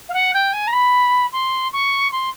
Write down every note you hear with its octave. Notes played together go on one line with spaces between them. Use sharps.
F5
F#5
G5
G#5
A#5
B5
C6
C#6
C6